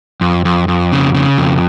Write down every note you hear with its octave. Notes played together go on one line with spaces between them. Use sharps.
F2
F2
F2
C#3
C#3
F2